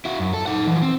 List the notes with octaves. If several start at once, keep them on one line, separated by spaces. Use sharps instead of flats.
E4 F#4
F#2
A4
D#4 F#5
E3 F3
C4